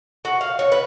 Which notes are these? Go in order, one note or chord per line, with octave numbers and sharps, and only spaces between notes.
F#4
F5
C#5
B4